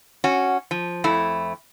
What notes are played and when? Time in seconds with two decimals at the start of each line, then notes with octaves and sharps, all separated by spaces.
0.24 C#4 F#4
0.71 F3
1.04 F2 A3 E4